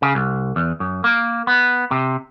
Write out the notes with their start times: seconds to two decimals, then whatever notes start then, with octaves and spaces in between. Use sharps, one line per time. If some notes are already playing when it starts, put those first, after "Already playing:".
0.02 C#3
0.15 C2
0.56 E2
0.80 F#2
1.04 A#3
1.47 B3
1.91 C3